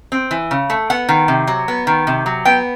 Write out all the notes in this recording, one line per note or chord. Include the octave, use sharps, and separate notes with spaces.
C4
E3
C#3
A3
B3 F#5
D#3
C3
F#3
B3
D#3
C3
F#3
B3 G5